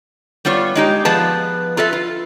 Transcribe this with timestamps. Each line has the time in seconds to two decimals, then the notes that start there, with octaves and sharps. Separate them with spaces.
0.45 G3 B3 F4 C#5
0.75 G#3 D#4 G4
1.05 F3 B3 G#4 B4 A5
1.77 F4 A4 B4 D#5 E5
1.93 F4